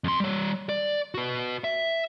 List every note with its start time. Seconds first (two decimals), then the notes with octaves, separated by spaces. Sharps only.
0.04 F2 C6
0.20 G3 C#5
0.69 D5
1.14 F#4 B4
1.64 E5